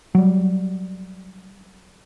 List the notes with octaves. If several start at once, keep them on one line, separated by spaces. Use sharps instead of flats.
F#3 G3